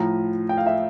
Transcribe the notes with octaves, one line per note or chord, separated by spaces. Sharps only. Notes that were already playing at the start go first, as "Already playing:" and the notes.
Already playing: A2 F3 A#5
G5
F5
E5